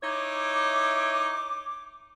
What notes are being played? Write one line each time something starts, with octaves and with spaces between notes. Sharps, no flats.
D#4 E4 C#5 D6